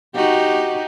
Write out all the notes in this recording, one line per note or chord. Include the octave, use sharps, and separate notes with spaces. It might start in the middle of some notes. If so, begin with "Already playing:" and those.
D#4 F#4 G4